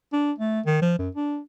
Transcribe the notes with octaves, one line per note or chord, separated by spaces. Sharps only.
D4
A3
D#3
F3
F#2
D4